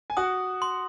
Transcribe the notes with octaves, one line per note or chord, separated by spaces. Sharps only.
G#5
F#4 F#5 D#6
C6